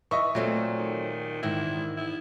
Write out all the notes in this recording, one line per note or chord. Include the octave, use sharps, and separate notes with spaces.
E3 B4 D#5 E5 C#6
A#2 F#3 A3 C4
D#3
G#2 D#3 E3 E4
E4